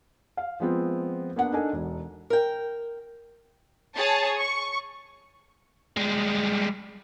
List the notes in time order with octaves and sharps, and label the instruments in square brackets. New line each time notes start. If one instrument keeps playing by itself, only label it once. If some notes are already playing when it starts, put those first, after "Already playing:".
[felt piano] F5
F3 G#3 B3 C4 F4
A#3 B3 D4 F#5
D4 D#4 A4 A#4 G#5
E1
[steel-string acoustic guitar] A#4 G5
[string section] G#4 C#5 A5
C#6
[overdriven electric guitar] G3 G#3